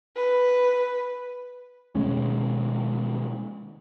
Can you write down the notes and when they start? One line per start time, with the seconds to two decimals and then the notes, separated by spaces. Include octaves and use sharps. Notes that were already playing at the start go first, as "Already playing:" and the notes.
0.16 B4
1.95 B2 D#3 G#3 C#4